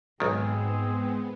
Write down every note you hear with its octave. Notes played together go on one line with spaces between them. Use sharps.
B1 G#2 D#3 G#3 B3 C4 G#4